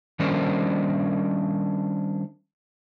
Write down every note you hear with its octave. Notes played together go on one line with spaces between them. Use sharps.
D#3 G3 C#4 D4 A#4 C5